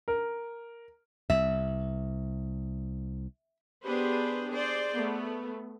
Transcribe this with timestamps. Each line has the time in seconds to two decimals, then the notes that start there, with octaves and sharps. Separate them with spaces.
0.08 A#4
1.30 C2 E5
3.85 B3 D4 G4 G#4 B4 C5
4.49 G#4 C5 D5
4.94 A3 B3